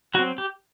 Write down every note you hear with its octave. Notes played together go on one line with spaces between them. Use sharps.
F#3 C4 F#4
G4